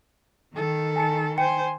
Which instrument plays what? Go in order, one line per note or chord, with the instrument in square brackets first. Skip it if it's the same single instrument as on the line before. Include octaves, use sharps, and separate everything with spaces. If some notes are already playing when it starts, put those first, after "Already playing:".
[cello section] D#3 [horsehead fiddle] A4
[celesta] G#5 A5 C#7
[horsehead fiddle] C5 G#5 [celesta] G5 C#7